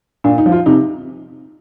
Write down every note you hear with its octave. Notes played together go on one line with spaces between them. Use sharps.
A#2 D4
D#4
F3
F4
C3 D#4